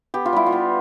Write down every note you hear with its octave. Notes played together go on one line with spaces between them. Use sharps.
B3 G4
F4
G3 E4
F4
B3